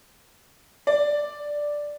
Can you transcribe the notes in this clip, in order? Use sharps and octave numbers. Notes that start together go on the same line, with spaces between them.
D5